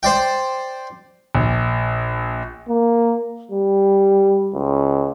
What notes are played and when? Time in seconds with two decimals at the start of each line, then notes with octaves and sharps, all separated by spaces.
0.03 C5 D5 G5
1.35 A#1
2.69 A#3
3.51 G3
4.54 C#2